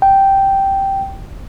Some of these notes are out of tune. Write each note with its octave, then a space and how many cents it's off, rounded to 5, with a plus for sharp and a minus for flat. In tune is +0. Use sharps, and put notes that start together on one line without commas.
G5 -5